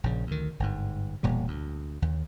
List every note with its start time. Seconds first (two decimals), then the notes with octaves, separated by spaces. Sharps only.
0.04 A#1 C#3
0.27 D2 D#3
0.60 G1 G#2
1.23 E1 A#2 G3
1.48 D2
2.02 D#2